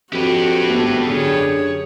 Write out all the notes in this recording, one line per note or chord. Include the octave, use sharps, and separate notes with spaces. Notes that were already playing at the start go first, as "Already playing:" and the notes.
F2 F#4 G4 B4
G#1 A3 B3
F#2 D3 G#4 C#5